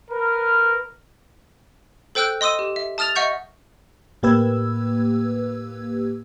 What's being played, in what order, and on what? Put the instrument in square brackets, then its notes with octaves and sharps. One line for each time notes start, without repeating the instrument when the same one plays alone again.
[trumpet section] A#4 B4
[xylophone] A4 C5 G5 E6 F#6 G6
D#5 C6 D#6 E6 D#7
G4
E5
A5 D#6 F6 A6 F7
D#5 E5 F#5 C#6 G6
[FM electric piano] A2 A#3 G4 B4 E6 G#6